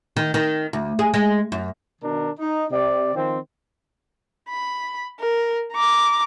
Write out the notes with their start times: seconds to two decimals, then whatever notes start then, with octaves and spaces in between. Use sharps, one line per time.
0.17 D#3
0.34 D#3
0.73 D2
0.99 G#4
1.14 G#3
1.52 F#2
2.01 B2 D#3 D4 A#4
2.39 D#4
2.70 C3 D5
3.15 D#3 F3 C4
4.49 B5
5.20 A#4
5.73 A#5 D6